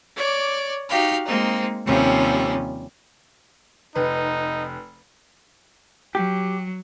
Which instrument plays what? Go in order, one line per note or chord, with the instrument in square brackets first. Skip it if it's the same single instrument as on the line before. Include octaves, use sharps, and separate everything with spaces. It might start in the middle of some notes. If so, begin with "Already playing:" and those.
[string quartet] C#5 D5 D6
D#4 F#4 G4 F5
G#3 A#3 C4 D#4
D#2 C3 F3 G3 C#4
[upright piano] F1 B4 [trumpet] D#4
[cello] F#3 [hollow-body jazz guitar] G4